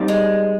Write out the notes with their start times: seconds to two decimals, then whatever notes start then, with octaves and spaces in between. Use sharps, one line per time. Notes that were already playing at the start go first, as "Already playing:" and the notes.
Already playing: G3 C4 D#4 G4 D5
0.08 G#3